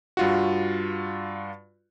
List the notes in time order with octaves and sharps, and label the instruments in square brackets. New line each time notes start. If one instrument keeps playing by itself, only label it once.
[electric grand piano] G2 F4 F#4